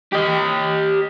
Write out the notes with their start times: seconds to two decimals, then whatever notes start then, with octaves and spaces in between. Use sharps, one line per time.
0.13 G4 D#5